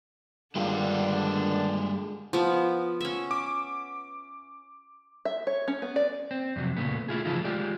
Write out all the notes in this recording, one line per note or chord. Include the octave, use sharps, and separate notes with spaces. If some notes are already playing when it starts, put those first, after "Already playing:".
G2 D3 D#3 G#3 B3 D4 F4 G4
F3 B3
C#4 E5
D6
E5
C#5
C#4
B3
D5
C4
F2 C3 E3 F#3
A#2 C#3 A3 B3
A3 E4 F4 G#4
C#3 E3 F3 A3 D#4 F4
G#3 F4 G4 D5